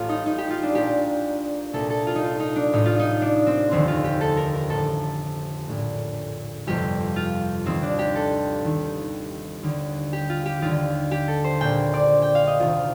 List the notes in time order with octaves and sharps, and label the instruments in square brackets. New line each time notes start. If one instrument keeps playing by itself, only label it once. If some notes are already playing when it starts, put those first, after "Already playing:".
Already playing: [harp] A1 A2 F4
D#4
D#4
G4
F4
D4
A#1 A#2 G4
C2 A#2 A4
A4
F4
D#4
F4
D#4
D4
A1 A2 D#4
F4
D#4
D4
C4
F1 D#2 D3 C4
F4
G4
A4
A#4
A#4
A1 A2 A4
A#1 A2
G1 F2 C3 G4
F4
D#2 D#3 C4
D4
G4
A4
D#2 D#3
D#2 D3
G4
F4
G4
D#2 D3 F4
G4
A4
C5
A#1 A#2 G5
D5
G5
F5
D#5
D2 C3 D#3 F4